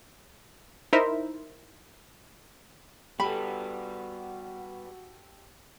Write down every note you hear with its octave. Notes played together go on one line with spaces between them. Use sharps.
D#4 E4 A#4 C5 E5
G3 B3 F#4 G4 A4 B5